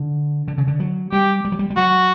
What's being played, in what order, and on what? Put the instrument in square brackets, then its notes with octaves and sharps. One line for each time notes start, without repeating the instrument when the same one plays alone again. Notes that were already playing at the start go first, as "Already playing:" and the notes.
Already playing: [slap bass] D3
D3
C#3
D3
F#3
[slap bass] G3 [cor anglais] G4
[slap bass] G3
F#3
G3
G3
[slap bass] F#3 [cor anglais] F#4